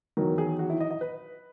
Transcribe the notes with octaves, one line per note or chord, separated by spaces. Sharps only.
E2 D#3 F#3 A#4
G#4
F#4
E4
D#5
D#5
B4